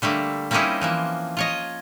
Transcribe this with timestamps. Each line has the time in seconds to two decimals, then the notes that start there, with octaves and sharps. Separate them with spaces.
0.02 D3 G3 A3 A#3
0.51 G3 A#3 C4 C#4 D#4 E4
0.81 E3 F3 A#3
1.37 F4 C#5 D#5